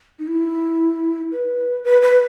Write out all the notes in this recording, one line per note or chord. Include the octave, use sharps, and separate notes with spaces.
D#4
E4
B4
B4
B4